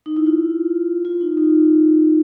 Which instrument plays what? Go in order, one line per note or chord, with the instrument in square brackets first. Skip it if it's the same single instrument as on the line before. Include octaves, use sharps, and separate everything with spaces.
[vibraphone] D#4
E4
F4
F4
D#4
D#4